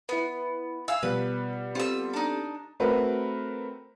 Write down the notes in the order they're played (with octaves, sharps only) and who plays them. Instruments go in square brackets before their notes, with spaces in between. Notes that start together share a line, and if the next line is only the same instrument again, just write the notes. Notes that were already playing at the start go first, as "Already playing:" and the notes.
[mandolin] B3 [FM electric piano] E4 B4
[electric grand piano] E5 F5 G#5 [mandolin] E6
[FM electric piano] B2 F3 [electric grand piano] G3 B3 [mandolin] B4
[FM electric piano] C4 G4 A4 [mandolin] F4 E6
[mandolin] D4 D#4
[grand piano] A3 C4 F#4 A#4 B4